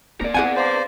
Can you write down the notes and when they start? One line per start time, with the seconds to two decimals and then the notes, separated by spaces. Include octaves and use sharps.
0.21 A#3 C4 A#4 D5
0.34 B3 C4 G#4 F#5 G#5
0.56 B4 C5 D5 F5